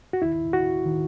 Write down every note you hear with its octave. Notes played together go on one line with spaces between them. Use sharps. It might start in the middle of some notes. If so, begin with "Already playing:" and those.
F#4
D#2 D#3 E4
F#4
D#3